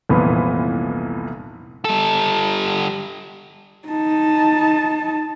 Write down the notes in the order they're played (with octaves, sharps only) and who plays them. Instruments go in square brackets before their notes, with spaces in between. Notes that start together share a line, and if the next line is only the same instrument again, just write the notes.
[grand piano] F1 C2 A#2 E3 B3
[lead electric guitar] G3 A4
[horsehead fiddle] D#4 A5